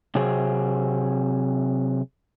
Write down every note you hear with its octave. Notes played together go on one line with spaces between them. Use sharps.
C3 F#3 C4 G#4